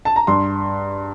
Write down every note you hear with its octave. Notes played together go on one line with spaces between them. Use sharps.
A5
A#5
G2 C6